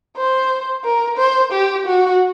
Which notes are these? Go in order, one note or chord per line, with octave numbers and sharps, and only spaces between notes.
C5
A#4
C5
G4
F#4